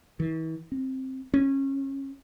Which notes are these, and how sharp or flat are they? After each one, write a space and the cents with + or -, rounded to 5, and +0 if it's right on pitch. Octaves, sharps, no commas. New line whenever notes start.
E3 -40
C4 +10
C#4 -25